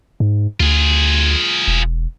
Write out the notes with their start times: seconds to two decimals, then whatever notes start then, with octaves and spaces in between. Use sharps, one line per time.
0.20 G#2
0.60 D2 F4 G#4
1.68 E1